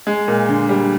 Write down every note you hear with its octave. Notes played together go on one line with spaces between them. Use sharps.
G#3
A#2
D3
G3